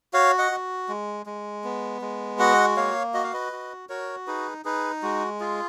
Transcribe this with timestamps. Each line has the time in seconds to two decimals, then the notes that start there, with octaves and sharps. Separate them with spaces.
0.13 F#4 C#5 F5
0.38 D#5 F#5
0.51 F#4
0.89 G#3
1.26 G#3
1.64 B3
2.02 G#3
2.39 F#4 D#5 F#5
2.77 A#3 C#5 F5
3.14 F#4 D#5
3.24 F5
3.33 B4 D#5
3.52 F#4
3.89 F#4 A#4 C#5
4.27 D#4 G#4 B4
4.65 D#4 G#4 B4
5.03 G#3 F#4
5.40 F4 G#4